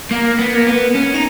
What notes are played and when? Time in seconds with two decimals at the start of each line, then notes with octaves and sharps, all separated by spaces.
0.11 A#3
0.38 B3
0.55 A#3
0.66 B3
0.95 C#4
1.14 D#4